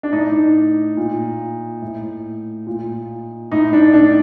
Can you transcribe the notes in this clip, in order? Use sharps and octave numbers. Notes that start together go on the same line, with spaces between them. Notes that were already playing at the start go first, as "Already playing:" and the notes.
D4
A2 D#4
A#2
A2
A#2
A2 D#4
D4
D4